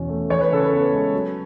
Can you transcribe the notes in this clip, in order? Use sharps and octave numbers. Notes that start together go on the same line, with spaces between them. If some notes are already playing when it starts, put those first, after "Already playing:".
Already playing: E2 B2 C#4
A3
E3 C#5
B4
C#3 A4
B4
B3
G#3
F#3